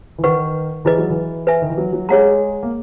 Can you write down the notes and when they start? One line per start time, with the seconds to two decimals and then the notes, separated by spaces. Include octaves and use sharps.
0.18 E3
0.24 D#3 B4 F#5 C#6
0.85 E3 E4 G#4 B4 D#5
0.98 F#3
1.10 E3
1.47 B4 E5 G#5
1.62 D#3
1.69 E3
1.78 F#3
1.93 F#3
2.09 G#3 G#4 C#5 F#5 A#5
2.63 A#3